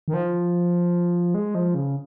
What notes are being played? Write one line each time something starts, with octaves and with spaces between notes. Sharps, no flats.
D#3
F3
G#3
F3
C#3